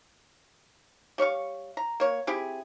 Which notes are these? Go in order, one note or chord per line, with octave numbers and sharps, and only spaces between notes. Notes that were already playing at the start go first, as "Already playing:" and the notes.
G3 C#5 F5 C#6
A#5
A#3 C#5
C4 E4 G4 G#4